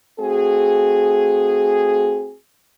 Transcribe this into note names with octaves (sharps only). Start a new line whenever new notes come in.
A3 C4 F#4 G#4